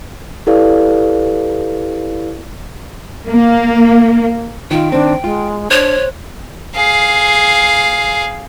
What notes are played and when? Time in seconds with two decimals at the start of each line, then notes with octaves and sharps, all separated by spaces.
0.47 E4 G4 A4 B4 D5 F5
3.26 A#3
4.71 D#3 D#4 F4 G5
4.92 D#3 C4 D4
5.24 G#3 F4
5.71 D4 C5 C#5
6.76 G#4 F5